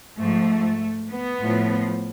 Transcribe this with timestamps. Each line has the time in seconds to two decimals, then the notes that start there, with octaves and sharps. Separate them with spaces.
0.17 G#2 F3 A3
1.11 B3
1.40 A2 F3